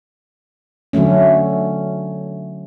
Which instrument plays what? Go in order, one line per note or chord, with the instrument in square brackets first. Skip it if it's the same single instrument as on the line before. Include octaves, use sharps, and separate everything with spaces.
[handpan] D3 F#3 A3 C#4